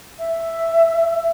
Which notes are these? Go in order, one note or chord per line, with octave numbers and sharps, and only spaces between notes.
E5